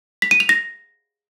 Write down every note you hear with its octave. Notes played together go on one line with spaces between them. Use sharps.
B6
D#7
F7
A#6